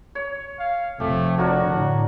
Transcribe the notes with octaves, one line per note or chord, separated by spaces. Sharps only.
C#5
F5
F1 F2 A3 G4
D4 F#4 A#4 C#5
A2 D3